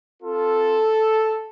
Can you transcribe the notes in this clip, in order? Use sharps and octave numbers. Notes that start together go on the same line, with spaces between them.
C4 F4 A4